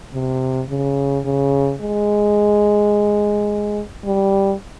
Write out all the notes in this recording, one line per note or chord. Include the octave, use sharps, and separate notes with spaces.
C3
C#3
C#3
G#3
G3